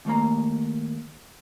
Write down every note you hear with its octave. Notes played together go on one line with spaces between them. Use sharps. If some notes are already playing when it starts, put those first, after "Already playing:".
D#2 A3 A#3 A#5